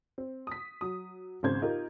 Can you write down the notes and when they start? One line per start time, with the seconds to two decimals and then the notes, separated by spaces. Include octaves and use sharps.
0.18 C4
0.47 D#6 B6
0.81 F#3 D#6
1.43 G#1 G#2 C#3 C5 G6 G#6
1.62 D#4 F4 G4 A#4